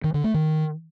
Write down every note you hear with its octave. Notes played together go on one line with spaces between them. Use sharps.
D#3
D3
A3
D#3